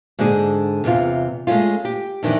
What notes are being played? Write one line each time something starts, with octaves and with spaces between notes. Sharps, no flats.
G#2 D3 D4 G#4
E2 C3 F4
G#3 A3 B3 C#4 F4
G4
F2 D#3 E3 D4